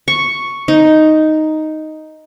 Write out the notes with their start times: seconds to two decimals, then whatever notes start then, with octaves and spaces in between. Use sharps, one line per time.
0.08 C#6
0.68 D#4